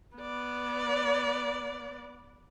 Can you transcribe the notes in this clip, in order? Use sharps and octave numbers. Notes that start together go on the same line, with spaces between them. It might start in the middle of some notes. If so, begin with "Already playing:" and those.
B3 D5